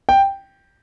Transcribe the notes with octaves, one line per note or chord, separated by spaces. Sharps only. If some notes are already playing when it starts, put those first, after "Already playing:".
G5